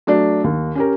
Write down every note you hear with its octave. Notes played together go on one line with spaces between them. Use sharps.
F#3 A3 D4
D#2
C#4 G4 A#4